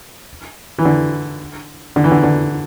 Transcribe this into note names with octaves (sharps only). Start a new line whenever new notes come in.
E3
D3
D3
E3
D3
D3